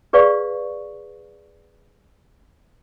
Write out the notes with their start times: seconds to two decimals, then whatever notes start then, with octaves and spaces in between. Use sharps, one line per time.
0.13 G#4 B4 D5 F5 C#6